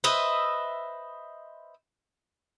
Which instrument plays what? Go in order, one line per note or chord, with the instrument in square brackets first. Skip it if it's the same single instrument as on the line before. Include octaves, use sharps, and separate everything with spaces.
[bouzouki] B4 C5 D#5 E5